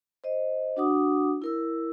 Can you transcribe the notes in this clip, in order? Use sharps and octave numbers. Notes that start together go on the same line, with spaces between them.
C5 D#5
D4 F#4 F#5 D6 D#6
E4 A#4 E6